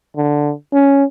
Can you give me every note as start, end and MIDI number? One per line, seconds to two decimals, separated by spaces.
0.17 0.52 50
0.74 1.04 61